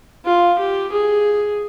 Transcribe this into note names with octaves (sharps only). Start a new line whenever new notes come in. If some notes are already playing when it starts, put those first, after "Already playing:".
F4
G4
G#4